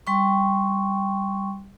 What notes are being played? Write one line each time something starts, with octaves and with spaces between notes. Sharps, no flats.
G3 G5 C6 C#6